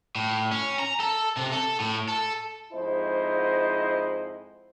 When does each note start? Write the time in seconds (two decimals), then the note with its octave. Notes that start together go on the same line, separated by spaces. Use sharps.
0.15 A2
0.52 C#4
0.79 A#5
1.00 A4
1.37 C3
1.52 A4
1.80 A2
2.08 A4
2.72 F2 G#2 E4 C5 D#5